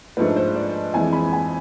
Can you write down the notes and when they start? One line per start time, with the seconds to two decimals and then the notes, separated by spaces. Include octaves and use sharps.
0.17 G#2 F3 A3 D4 B4
0.36 C5
0.56 D5
0.94 F2 E3 G#3 G#5
1.13 B5
1.33 G#5